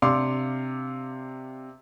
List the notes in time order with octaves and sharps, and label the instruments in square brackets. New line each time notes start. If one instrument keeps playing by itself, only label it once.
[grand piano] C3 D4 F5 C6 D6